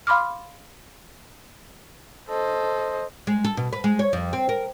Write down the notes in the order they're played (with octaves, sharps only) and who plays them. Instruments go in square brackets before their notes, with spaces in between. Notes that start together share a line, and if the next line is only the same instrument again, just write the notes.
[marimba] F5 B5 C6 D6 F6
[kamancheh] A4 [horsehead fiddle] C5 D#5
[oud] G#3
A4
B2
B4
G#3
C#5
F2
C4
A#4